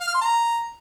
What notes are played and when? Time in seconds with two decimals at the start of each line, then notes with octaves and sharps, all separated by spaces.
0.01 F5
0.08 F6
0.14 C6
0.21 A#5